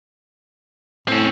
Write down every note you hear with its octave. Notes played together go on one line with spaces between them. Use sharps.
A2 C4 C#4